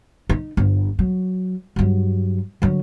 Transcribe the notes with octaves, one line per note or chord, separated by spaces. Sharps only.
D#4
G1
F#3
G2 F#3
D3 F#3